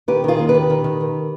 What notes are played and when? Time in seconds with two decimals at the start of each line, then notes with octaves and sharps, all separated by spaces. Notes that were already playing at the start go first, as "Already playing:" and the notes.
0.08 D#3 G4 B4
0.24 D#3 F4 G#4
0.39 D#2
0.49 G4 B4
0.54 D#3
0.70 D#3
0.84 D#3
1.00 D#3